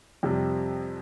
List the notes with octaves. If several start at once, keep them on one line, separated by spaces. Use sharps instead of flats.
F2 C3 G3